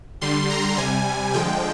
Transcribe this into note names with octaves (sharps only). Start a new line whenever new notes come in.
D3 G3 C6
A#5
C3 G3 G#5
D3 F3 G#3 G5